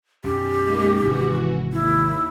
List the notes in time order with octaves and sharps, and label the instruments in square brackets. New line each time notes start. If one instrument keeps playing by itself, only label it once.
[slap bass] B1 F#2 [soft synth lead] C#4 [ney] G4
[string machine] G#3 A#3 D#4
[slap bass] G#1 C3 G#3 [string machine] E3 F#4
[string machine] D#2 [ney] E4